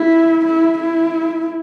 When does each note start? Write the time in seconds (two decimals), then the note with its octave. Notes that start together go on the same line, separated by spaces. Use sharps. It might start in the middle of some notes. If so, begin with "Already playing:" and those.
Already playing: E4
0.45 E4
0.78 E4